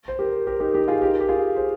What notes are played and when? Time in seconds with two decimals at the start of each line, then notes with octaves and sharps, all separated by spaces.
0.08 C5
0.19 G4 A#4
0.47 G4 A#4
0.60 D#4 G4
0.74 D#4 G4
0.88 F4 G#4
1.02 G4 A#4
1.20 G4
1.29 F4 G#4
1.56 G#4 C5